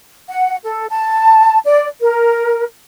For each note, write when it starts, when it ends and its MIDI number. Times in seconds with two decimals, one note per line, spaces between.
0.28 0.55 78
0.64 0.86 69
0.89 1.57 81
1.66 1.86 74
2.00 2.64 70